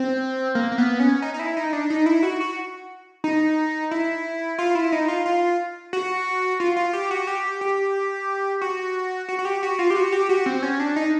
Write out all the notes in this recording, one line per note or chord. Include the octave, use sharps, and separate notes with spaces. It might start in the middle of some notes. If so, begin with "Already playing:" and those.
Already playing: C4
A#3
A#3
B3
C#4
D#4
D#4
E4
D#4
D4
D#4
E4
F#4
F#4
D#4
E4
F4
E4
D#4
F4
F4
F#4
F4
F4
G4
F#4
G4
G4
F#4
F#4
F#4
G4
F#4
F4
G4
F#4
G4
F#4
C4
C#4
D4
D#4